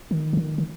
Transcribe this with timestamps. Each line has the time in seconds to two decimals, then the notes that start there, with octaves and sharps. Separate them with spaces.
0.11 D#3
0.33 D3
0.37 D#3
0.58 D#3